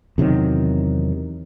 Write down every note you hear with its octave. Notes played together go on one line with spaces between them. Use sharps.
E2 C3 D#3 F#3